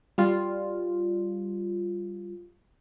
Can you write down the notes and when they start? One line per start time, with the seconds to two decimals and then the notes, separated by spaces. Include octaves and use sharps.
0.18 G3 F4